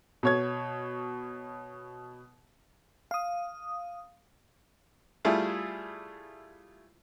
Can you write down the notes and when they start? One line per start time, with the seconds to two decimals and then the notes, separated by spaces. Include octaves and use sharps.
0.23 B2 C#5 G#6
3.11 F5 D#6
5.25 G3 A3 E4 F4 G#4